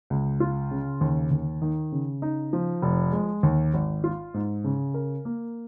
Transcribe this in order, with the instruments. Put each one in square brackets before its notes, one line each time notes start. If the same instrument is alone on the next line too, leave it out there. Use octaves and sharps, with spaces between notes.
[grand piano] C#2
F4
C#3
D#2
D#2
D#3
C#3
D#4
F3
F1
G#3
D#2
G#1
F4
G#2
C#3
A#4
A#3